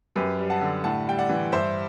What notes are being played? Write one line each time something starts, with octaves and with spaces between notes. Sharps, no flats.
F#2 G4 B4
G3
F#5 A5
D3
A2 F#5 A5
G3 G5
D5 F#5
E3
G2 C5 E5